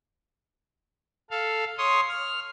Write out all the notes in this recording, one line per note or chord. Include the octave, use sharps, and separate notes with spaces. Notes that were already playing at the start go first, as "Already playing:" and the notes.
A4 F5
C#5 C6 D#6
F6